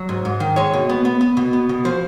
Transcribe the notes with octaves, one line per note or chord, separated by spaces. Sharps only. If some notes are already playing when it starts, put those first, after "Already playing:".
Already playing: F#3
G#2
G#2
D#3
G#3 C#5
B2
B3
B3
B3
B2
B3
B2
F3 C5